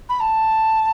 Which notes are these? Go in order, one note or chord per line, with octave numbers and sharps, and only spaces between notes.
B5
A5